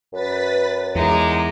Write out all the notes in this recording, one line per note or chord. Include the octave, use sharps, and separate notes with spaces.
F#2 B4 A6 B6
E2 G#3 D#4 D6